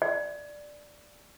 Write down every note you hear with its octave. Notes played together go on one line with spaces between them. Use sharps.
D5